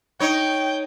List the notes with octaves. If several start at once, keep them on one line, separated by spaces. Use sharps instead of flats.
D#4 C#5 G5